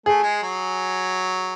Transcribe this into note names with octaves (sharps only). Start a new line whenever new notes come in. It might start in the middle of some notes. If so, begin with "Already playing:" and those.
A3 G#4
G#3
F#3